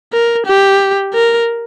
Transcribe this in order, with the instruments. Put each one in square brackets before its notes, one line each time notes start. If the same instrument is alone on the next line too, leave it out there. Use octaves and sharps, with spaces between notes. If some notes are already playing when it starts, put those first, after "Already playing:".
[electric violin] A#4
G4
A#4